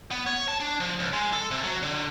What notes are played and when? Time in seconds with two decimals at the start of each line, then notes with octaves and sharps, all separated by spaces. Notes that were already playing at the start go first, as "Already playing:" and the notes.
0.11 B3
0.26 C#5
0.48 A5
0.60 D4
0.80 F3
0.99 C#2
1.13 G#3
1.33 A4
1.51 C3
1.64 F#3
1.83 D3